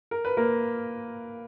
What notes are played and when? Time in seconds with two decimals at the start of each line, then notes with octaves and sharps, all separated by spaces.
0.11 A#4
0.25 B4
0.37 A#3 A#4